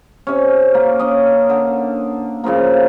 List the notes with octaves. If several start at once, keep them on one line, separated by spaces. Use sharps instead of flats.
C3 C#4
A#3
C#4 D#5
D3
A#2 C#3 F3 A#3